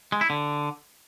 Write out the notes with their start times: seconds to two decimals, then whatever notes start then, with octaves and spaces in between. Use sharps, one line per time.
0.12 G#3
0.21 E4
0.30 D3